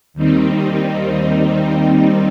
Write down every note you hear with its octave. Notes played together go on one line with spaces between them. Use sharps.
D#2 D#3 G3 C4 D#4